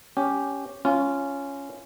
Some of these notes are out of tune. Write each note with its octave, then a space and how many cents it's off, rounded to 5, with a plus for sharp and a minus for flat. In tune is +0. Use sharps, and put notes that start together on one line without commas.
C#4 +10 G4 +0
C#4 +5 F4 -15